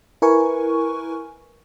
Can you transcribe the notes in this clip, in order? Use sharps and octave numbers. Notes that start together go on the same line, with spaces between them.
E4 A#4 B4 G#5 C#6